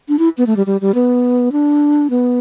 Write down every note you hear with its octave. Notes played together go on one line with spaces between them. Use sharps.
D4
E4
B3
A3
G3
G3
G3
B3
D4
B3